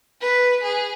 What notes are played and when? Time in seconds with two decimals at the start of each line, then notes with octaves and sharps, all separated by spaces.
0.21 B4
0.63 G#4